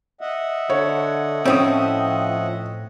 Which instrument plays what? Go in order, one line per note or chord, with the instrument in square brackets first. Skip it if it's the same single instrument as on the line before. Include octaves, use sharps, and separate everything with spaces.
[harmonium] D#5 E5 F#5
[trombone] D3 [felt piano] C#5
[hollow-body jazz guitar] A2 C4 [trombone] F3 [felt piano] C#4 D#6